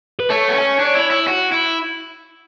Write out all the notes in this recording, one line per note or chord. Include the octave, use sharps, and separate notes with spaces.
B4
A3 C#5
B3
C#4
D4
E4
E4
F#4
E4